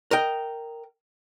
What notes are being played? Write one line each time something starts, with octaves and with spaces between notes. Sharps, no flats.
A#4 D#5 G5